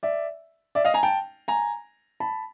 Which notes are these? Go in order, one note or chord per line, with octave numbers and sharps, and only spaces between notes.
D5 E5
D5 E5
D#5 F5
G#5 A#5
G5 A5
G#5 A#5
A5 B5